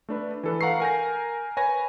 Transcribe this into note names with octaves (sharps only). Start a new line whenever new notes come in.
A3 D4 B4
E3 A4 B4
F5 F#5 A#5 C#6 C7
A#4 G#5 G6 A#6
B4 C#5 G#5 A#6